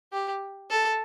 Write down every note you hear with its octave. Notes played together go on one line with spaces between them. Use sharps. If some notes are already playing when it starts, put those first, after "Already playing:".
G4
A4